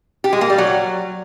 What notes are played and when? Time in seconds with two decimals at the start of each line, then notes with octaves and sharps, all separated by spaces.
0.24 G4
0.33 G#3
0.41 A#3
0.50 G3
0.58 F#3